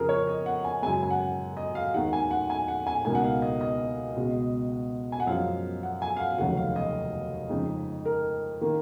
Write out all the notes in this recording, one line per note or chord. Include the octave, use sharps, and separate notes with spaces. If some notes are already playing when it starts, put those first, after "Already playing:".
Already playing: F2 C#3 F3 G#4 A#4
C#5
D#5
F#5
G#5
F#2 C#3 G#3 G#5
G#5
F#5
D#5
F5
D#2 D#3 G#3 F#5
G#5
F#5
G#5
F#5
G#5
C#2 B2 A#3 D#4 G#5
F#5
F5
D#5
D#5
C#2 B2 G#3
G#5
F#5
F#2 F3 G#3 F5
F#5
G#5
F5
F#5
F1 D#2 C#3 F#3 F#5
F5
D#5
F2 C#3 G#3 D#4
A#4
D#3 A#3